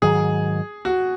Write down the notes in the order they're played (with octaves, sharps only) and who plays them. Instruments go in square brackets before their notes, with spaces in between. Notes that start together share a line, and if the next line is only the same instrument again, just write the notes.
[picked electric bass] G#2 D#3 F#3 [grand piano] G#4
[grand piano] F#4